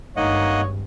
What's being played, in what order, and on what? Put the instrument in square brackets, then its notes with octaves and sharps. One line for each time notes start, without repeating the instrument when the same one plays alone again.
[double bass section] G#1 G2 [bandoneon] A#3 D#5 F#5 [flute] D#4 [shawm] C#5